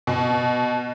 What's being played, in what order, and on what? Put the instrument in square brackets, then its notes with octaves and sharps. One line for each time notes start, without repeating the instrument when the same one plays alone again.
[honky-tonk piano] B2